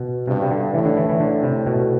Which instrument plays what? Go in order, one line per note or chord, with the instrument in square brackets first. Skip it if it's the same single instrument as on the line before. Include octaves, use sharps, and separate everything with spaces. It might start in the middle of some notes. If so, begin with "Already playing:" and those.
Already playing: [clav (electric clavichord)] B2
[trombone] G2 [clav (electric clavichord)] C3
[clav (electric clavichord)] C3
D3
[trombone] A2 [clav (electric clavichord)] E3
[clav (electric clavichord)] D3
E3
E3
[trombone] A2 [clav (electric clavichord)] D3
[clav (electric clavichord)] C3
B2